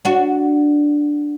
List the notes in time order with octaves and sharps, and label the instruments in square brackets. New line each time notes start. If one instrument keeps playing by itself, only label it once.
[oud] D4 F#4